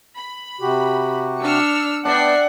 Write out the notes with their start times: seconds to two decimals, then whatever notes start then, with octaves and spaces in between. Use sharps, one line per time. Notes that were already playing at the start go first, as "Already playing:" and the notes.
0.16 B5
0.61 C3 F#4 G4
1.42 D4 E6 F6 C#7
2.05 B3 D4 D5 E5 F#5 G5 A5 C7